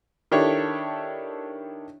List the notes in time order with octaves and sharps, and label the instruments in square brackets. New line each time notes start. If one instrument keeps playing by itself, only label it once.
[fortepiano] D#3 D4 E4 G4 A4 C#5